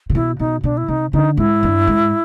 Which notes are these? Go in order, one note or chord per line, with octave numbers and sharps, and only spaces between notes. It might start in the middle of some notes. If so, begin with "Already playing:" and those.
C3
B2 E4
B2 D#4
B2 D4
E4
C3 D#4
D3 D#4
G#2 E4
G2
G#2